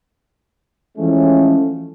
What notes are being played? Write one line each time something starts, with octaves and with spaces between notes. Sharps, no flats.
E3 F3 G#3 A3 C#4